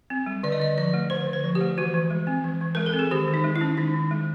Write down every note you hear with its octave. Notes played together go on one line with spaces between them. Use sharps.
C4
G3
D3 D5
D#5
D3 D5
F3 D5
A3
D3 C5
D3
C5
F3
G4
A3
E3 F#4
E3
G#3
C4
E3
E3
G#3 A#4
A4
C4
G#4
D#3 G4
D#3
D#4
G#3
E4
C#4
D#3 D#4
D#3
G#3